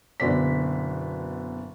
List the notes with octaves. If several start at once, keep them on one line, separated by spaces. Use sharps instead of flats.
F#1 B2 D3 D5 B6